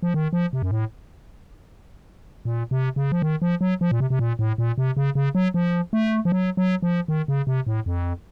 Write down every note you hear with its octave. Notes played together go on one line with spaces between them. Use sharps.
F3
D#3
F3
C3
F#2
A2
A#2
C3
C#3
F3
D#3
F3
F#3
F3
A#2
C3
C3
A#2
A2
A#2
C3
C#3
C#3
F#3
F3
A3
F3
F#3
F#3
F3
D#3
C#3
C3
A2
F2